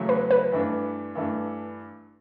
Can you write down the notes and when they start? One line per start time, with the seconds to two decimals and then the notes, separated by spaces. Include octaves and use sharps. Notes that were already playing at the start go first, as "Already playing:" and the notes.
Already playing: E2 C#3 F#3 A3
0.09 B4
0.31 B4
0.52 G2 E3 A3 D4
1.15 G2 E3 A3 D4